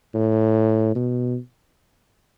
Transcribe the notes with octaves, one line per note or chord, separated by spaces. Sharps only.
A2
B2